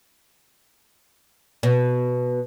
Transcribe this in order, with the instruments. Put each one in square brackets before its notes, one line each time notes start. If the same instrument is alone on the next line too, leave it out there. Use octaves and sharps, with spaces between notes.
[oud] B2